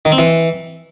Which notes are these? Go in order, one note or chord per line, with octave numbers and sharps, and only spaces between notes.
D#3
C4
E3